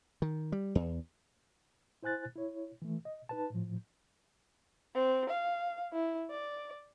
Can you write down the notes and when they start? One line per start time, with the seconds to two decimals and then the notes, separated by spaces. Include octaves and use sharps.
0.22 D#3
0.52 G3
0.75 E2
2.03 E4 C5 G#5 F#6 A6
2.36 E4 C#5
2.82 E3 A3
3.05 D#5
3.29 D#4 B4 A5
3.50 A2 F3
4.94 C4
5.29 F5
5.93 E4
6.31 D5